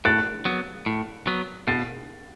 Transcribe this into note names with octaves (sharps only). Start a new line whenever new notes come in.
A2 F#6 A6
F#3 B3
A2
F#3 B3
B2 A6 C7